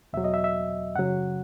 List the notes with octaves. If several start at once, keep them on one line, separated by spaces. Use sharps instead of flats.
E2 B2 F#3 E5
D#5
E5
E5
F#2 C#3 F#3 F#5